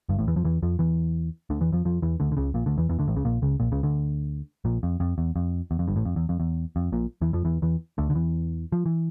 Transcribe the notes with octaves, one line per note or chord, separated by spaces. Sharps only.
G1 G2
A1 A2
E2 E3
F2 F3
E2 E3
F2 F3
E2 E3
D2 D3
E2 E3
F2 F3
F2 F3
E2 E3
D2 D3
D3
C#2 C#3
A#1 A#2
D2 D3
E2 E3
E2 E3
D2 D3
A1 A2
C#2 C#3
A#1 A#2
C#2 C#3
A#1 A#2
C#2 C#3
D2 D3
A#1 A#2
F2
F2
E2
F2
E2
F2
G1 G2
A1 A2
F2
E2
F2
E2
F2
A#1 A#2
E2 E3
F2 F3
E2 E3
E2 E3
D2 D3
D3
E2 E3
F3
E3